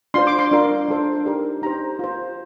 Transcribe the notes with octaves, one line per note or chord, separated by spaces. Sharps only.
D4 F4 C5 C6
D6
C6
D4 F4 A#4
D4 A4 C5
D#4 G4 A#4
D#4 G4 C5 A#5
F4 C5